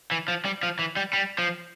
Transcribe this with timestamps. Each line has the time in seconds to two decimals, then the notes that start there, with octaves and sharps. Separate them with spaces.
0.11 E3
0.28 F3
0.45 G3
0.63 F3
0.79 E3
0.97 G3
1.13 G3
1.38 F3